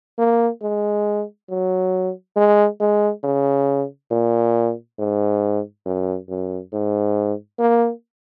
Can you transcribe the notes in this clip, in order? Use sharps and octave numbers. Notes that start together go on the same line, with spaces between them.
A#3
G#3
F#3
G#3
G#3
C#3
A#2
G#2
F#2
F#2
G#2
A#3